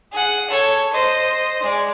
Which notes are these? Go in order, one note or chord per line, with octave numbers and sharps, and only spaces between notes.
G#4 F#5
A4 C#5
C5 D#5
G#3 D5